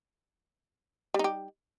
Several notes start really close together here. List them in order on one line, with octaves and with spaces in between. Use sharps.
G3 D#4 G4